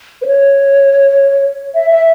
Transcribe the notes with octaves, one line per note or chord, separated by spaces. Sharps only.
B4
C#5
E5
E5